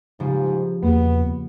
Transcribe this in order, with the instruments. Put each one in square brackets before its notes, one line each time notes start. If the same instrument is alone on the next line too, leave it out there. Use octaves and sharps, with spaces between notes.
[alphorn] G#2 [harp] C#3 F3 G3
[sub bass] E2 [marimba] A#3 G#4 [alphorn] B3